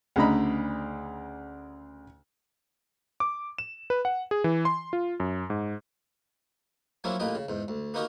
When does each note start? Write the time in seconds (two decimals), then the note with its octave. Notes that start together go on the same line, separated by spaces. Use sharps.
0.16 D2 C#3 D4 D#5 A#5 B5
3.20 D6
3.58 E7
3.90 B4
4.05 F#5
4.31 G#4
4.44 E3
4.65 C6
4.93 F4
5.20 F#2
5.50 G#2
7.04 F3 F#3 A#3 C#4 D4 E4
7.20 A1 A#2 A#3 B4 D#5 G5
7.35 C#3
7.49 E2 G#2
7.68 D2
7.94 A#3 B3 D#4 F#4 G4 A#4